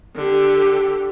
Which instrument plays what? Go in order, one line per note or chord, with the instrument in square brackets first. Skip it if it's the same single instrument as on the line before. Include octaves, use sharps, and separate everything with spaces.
[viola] D3 G4